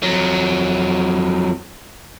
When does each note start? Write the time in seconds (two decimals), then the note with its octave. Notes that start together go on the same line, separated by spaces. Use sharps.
0.03 F2 F#3